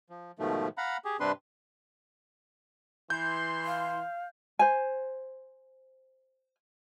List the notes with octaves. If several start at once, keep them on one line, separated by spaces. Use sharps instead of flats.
F3
G#2 B2 D#3 F3 A3
F5 F#5 A#5 B5
G4 G#4
G2 C3 C4 D4 B4 C6
E3 C6 G6
F5
C5 G#5